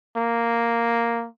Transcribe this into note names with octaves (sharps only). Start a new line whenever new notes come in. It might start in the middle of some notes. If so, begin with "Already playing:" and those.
A#3